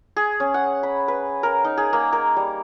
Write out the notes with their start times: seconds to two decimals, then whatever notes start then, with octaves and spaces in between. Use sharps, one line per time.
0.16 G#4
0.40 C#4
0.54 F#5
0.83 B5
1.08 B4
1.43 A#4
1.64 D#4
1.77 G#4
1.93 A#3
2.13 A#4
2.36 G3